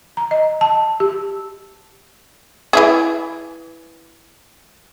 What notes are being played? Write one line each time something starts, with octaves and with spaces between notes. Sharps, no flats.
A#5
D#5
A5
G4
E3 E4 G#4